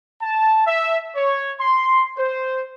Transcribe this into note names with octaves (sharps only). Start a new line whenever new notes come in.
A5
E5
C#5
C6
C5